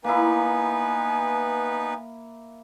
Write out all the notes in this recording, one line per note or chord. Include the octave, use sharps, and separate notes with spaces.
A#3 B3 D#4 E4 B4 G#5